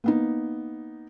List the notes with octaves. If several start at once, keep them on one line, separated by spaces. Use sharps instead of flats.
A#3 B3 D#4